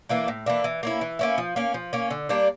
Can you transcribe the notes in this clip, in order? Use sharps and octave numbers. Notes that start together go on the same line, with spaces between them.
E3 A#3 D4
A2
E3 A#3 D4
E3
A#3 C#4 E4
E3
A#3 C#4 E4
F3
A#3 C#4
F3
A#3 C#4
D3
G3 A#3 D4